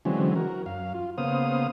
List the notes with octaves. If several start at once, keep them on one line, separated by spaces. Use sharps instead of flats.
D3 E3 F#3 G#3 C4 C#4
F#4 A#4
F#2 F5
F4
C#3 A#3 B3 C5 F5 D#6